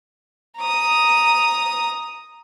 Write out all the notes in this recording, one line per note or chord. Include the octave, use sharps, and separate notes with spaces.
A#5 D#6